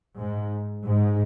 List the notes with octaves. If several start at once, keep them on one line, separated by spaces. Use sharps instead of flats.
G#2
G#2